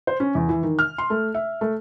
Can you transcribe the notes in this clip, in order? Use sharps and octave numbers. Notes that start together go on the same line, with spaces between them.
C5
C#4
E2
E3
D#3
F6
C6
A3
E5
A3